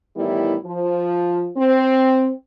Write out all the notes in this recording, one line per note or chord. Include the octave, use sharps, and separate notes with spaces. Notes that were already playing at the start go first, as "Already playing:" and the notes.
A2 D#3 E3 G3 B3 E4
F3
C4